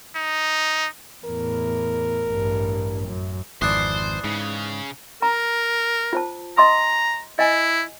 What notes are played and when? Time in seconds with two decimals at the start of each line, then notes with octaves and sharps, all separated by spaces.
0.16 D#4
1.25 E2 A2 A#4
2.29 A1 G2
3.07 F#2
3.62 G#1 F2 E3 D4 C5 D#6 F#6 C7
4.24 G#2 C#3
5.22 A#4 A#5
6.13 F4 C5 A5
6.57 D#5 A#5 C6 D#6
7.39 E4 D#5 G#5